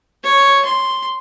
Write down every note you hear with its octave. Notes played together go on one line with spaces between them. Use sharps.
C#5
C6